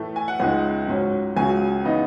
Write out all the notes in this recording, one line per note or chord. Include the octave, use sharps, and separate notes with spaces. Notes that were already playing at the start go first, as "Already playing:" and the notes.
Already playing: A2 E3 A3
G#5
F#5
C#2 C#3 G#3 D#4
G#2 F#3 C#4
C#2 C#3 F#3 G#5
C#3 E3 B3 D#4